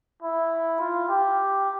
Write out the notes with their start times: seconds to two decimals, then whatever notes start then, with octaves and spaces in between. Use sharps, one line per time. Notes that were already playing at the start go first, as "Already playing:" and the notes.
0.23 E4
0.80 F4
1.09 G4